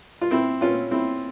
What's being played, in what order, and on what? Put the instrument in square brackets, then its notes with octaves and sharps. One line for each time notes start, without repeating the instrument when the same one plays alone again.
[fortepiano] F4
C4 E4
C#4 F4
C4 E4